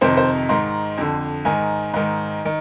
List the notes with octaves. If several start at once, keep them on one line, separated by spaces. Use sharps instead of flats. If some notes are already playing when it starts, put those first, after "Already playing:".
F2 C3 D#3 C5
C5
G#2 D#3 C6
F2 D3
G#2 D#3 G#5
G#2 D#3
D#3